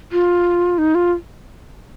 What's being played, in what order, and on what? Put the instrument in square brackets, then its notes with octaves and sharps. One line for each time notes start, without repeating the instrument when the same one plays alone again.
[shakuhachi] F4
D#4
F4